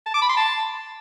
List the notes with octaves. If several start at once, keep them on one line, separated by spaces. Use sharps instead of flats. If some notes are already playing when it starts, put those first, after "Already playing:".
A5
D6
B5
C6
A5